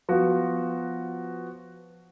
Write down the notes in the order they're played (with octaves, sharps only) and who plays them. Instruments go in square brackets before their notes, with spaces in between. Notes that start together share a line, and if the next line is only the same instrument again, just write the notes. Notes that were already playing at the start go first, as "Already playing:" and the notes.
[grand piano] F3 B3 F#4